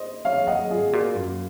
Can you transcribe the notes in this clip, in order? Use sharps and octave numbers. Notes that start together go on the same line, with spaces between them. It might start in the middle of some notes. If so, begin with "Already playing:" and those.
Already playing: C5 D#5
F#3 C#5 F5
F#3 D#5 F#5
G#2 F4 G#4
A#2 F#4
F#2 F4